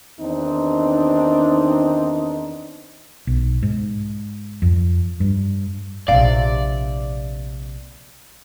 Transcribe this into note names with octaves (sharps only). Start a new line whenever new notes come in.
E2 D#3 C4 D4 D#4
B1
G#2
F2
G2
A#1 C3 D5 F5